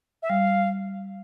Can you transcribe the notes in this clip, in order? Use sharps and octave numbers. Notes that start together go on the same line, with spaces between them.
E5
G3 F5